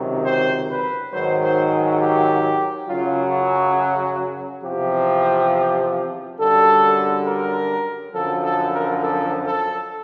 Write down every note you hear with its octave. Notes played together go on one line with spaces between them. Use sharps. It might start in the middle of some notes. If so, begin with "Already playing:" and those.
Already playing: C#2 C3 D#3 F#3
C5
B4
G#2 D#3 F#3 C5
C5
G#4
G4
F#2 C#3 F#3 F4
F#4
E2 C3 F3 G4
F#2 D3 G3 A4
A#4
F#2 D3 F3 A4
A4
A#4
A4
A4